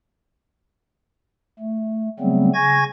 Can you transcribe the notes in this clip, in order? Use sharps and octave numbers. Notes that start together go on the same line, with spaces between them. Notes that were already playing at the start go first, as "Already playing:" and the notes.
A3
C#3 F#3 G3 A3 B3 C4
C#3 G#5 C#6 G#6 A#6